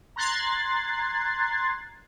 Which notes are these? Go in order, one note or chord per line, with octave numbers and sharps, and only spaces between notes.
A#5 C6 F#6 G#6 A6 C7